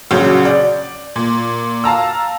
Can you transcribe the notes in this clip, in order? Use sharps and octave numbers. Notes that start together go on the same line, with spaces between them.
A#1 C#3 F#3 F#4 G6
D5
A#2
F5 A5 A#5 E6